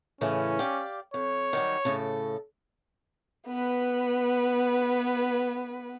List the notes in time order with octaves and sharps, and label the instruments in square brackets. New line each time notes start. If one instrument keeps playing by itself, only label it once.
[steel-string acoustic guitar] A2 C#3 E3 [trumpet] C#4
[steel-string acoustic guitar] G4 D5 F5
[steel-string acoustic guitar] F2 [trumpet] C#5
[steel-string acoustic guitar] D#3 F#3 G3
A2 C#3 A4
[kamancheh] B3 B4